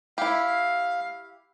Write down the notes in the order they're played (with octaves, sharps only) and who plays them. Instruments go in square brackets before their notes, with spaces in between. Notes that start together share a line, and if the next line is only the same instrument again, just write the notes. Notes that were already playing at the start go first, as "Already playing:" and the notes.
[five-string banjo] E4 G4 [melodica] F5